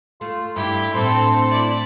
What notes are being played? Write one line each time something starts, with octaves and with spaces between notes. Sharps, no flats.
A3 F4
G2 E4 G4 G5
A2 C4 A4 C5
E4 D5